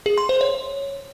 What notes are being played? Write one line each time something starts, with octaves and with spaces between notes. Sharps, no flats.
G#4
C6
C5
C#5